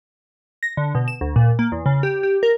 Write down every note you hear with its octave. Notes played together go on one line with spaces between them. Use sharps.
A#6
D3
B2
E7
D2
A#2
A#3
E2
C#3
G4
G4
A#4